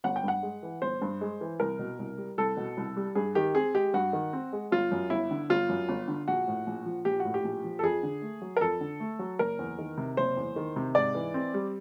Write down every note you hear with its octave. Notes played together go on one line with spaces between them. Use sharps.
G1 F#5
G5
G2 F#5
G#3
E3
G1 C5
G2
G#3
E3
C2 A#4
B2
C2
G3
C2 A4
B2
C2
G3
G2 G#4
D#3 G4
C4 G#4
G#3 G4
G2 F#4
D#3
C4
G#3
G1 F4
F#2
G1 E4
D3
G1 F4
F#2
G1
D3
A#1 F#4
A2
A#1
F3
A#1 G4
F#4
A2
G4
A#1
F3
A4
F2 G#4
D3
A3
F#3
A#4
F2 A4
D3
A3
F#3
F#1 A#4
E2
D#3
C3
F#1 C5
E2
D#3
C3
G#2 D5
E3
C4
G3